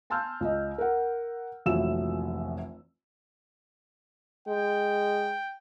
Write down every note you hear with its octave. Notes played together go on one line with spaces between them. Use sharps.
G#5 A5 C6 E6 F6 G6
C#2 D#5
A#4 F#5
F1 A#1 E3 F#3 E6 E7
G#3 G5